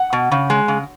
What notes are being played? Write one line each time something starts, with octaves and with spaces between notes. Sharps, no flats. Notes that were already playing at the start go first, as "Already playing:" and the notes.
Already playing: F#5
B2
C#3
G#3
C#3